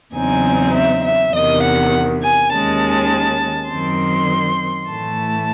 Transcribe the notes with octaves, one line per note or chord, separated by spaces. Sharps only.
E2 C#3 F#3 C4 D#4 G#5
E5
E5
E2 C3 D#3 D#5
F#5
G#5
D#2 D#3 G#3 C#4 A5
F#2 D#3 F#3 C4 C6
A2 E3 A3 A5